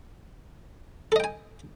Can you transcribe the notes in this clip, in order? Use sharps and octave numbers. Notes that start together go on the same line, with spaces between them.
A4 D#5 G5 G#5